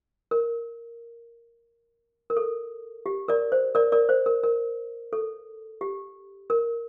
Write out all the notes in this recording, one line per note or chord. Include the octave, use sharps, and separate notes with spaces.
A#4
A#4
A4
G4
A#4 D5
C5
A#4 D5
A#4 D5
C5
A#4
A#4
A4
G4
A#4